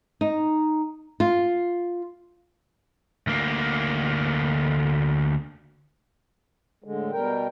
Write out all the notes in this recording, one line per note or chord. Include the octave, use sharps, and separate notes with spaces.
D#4
F4
D2 A#3
A2 D3 G#3
B2 G3 A#4 G5